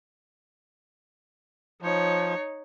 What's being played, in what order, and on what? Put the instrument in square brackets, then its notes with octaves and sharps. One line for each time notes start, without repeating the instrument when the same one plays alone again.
[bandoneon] F3 [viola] D#4 C#5